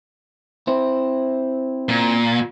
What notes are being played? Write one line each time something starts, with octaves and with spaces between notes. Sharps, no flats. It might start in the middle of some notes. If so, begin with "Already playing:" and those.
C4 E4 C5
A#2